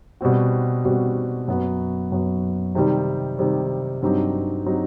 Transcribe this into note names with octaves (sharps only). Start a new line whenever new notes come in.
B2 G3 C4 F#4
B2 G3 C4 F#4
F#2 F#3 B3
F#2 F#3 B3
C3 D#3 G3
C3 D#3 G3
G2 F#3 C4 D#4 G4
F#3 C4 D#4 G4